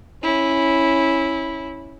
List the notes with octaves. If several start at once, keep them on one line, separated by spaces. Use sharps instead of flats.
C#4 E4